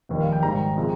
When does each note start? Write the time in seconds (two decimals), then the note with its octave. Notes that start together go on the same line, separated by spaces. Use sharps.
0.09 F1 D#2 D#3 G3
0.20 F5
0.32 G5
0.43 G#1 G#2 G3 A#5
0.76 C3 F3 G#3